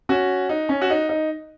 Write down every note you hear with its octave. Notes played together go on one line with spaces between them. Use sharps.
C#4 F#4
D#4
C#4
F#4
D#4
D#4